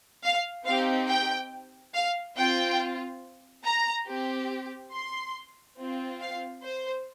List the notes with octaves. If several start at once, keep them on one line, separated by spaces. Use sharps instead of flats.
F5
C4 D#4 G4 F5
G5
F5
C4 F4 G5
A#5
C4 G4
C6
C4 F4
F5
C5